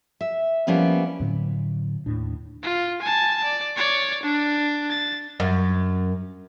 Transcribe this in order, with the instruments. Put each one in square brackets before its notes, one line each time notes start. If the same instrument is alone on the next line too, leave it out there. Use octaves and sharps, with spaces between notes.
[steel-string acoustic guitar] E5
F3 G3 A#3 B3 C#4 E4
[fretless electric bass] A2 D3 F#3 B3
D#2 A2 D4
[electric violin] F4
G#5 A5
D5
C#5 D5
D4
A6
[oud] F#2